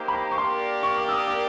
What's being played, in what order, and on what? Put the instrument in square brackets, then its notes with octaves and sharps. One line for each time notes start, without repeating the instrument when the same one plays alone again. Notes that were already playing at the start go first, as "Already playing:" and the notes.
Already playing: [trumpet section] A#3 D#4 G4 C5
[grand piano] B5
A#5
C#6
[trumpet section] A#3 D4 G4 A#4 D5 [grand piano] C6
[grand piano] C#6
D6
E6
D#6
D6